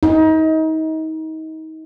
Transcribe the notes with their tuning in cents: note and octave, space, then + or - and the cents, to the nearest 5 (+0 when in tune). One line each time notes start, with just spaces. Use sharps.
D#4 +30